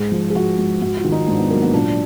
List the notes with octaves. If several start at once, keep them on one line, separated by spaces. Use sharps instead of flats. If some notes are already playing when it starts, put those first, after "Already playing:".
Already playing: G#2 G#4
F3
G#4
F3 F#4
G#2
G#2 F#4
F4
D#3
D#4
G#2 D4
B3
F#3 A#3
B3
A#2 D4